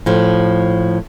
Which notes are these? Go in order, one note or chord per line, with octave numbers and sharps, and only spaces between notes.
A2 F3